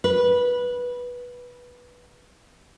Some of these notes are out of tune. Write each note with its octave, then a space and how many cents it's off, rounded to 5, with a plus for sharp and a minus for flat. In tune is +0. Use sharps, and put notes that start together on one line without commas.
B4 -15